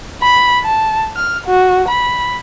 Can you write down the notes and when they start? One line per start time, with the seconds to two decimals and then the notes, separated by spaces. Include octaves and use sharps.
0.22 B5
0.64 A5
1.16 F6
1.47 F#4
1.88 B5